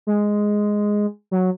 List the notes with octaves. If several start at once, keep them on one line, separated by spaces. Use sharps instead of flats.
G#3
F#3